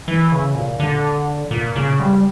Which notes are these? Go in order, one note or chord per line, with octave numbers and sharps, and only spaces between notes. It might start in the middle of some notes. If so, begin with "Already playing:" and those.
E3
C#3
A#2
D3
A#2
C#3
G3